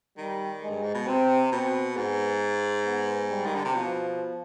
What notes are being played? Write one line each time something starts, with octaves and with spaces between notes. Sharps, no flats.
D#3 G3
G#3
G2
G#2
B2
C3 C4
B2 C4
G#2 B3
B3
G3
D#3
D3
C3
B2 F3